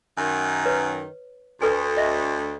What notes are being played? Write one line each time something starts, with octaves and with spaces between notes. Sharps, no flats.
F#2 D#3
B4 C#5
D2 A4 B4 G#5
D#5 E5